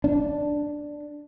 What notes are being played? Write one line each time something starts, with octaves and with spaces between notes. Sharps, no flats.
D4